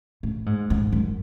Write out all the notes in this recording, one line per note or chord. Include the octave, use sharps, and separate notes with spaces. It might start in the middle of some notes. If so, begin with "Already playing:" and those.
A2
G#2
G#2
F#2